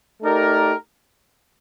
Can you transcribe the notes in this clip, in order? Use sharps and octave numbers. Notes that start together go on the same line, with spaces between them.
A3 D#4 G4 A#4 D5